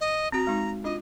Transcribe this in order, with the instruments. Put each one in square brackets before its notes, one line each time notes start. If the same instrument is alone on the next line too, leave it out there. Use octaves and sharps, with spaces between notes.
[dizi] D#5
[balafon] C4 F#4 [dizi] A#5
[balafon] G#3 D#4
[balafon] D4 F4 [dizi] D#5